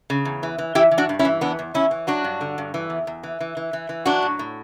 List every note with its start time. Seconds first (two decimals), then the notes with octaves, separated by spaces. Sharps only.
0.10 C#3
0.25 E2
0.43 E3
0.58 E3
0.75 E3 E4 G4
0.91 E3
0.98 D4 F#4
1.09 G2
1.19 C#4 E4
1.25 E3
1.41 E2 B3 D4
1.59 E2
1.74 E2 C#4 E4
1.91 E3
2.07 F#3 D4 F#4
2.24 G2
2.41 D3
2.58 G2
2.74 E3
2.90 E2
3.07 E2
3.23 E3
3.41 E3
3.57 E3
3.73 E3
3.89 E3
4.06 F#3 D4 F#4
4.22 A2
4.39 A2